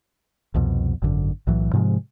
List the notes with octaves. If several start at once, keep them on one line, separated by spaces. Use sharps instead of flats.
C2 F2 B2
G#1 F#2 D3
B1 A2 E3 F#3
G#2 C3 F3 G#3